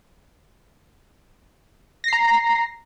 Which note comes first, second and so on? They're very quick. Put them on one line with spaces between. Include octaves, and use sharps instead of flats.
A#6 C7 A#5